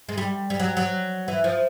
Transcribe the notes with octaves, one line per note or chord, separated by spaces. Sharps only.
G#3
G3
G3
F#3
F#3
E3
F3